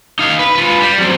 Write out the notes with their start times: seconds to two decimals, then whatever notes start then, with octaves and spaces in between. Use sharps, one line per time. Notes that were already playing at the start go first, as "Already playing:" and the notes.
0.19 D#4 F5
0.39 B4
0.55 F4 B4
0.80 G3
0.98 F#3 C4